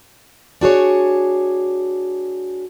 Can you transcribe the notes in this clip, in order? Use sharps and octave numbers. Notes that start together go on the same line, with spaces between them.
D4 F#4 G#4 C#5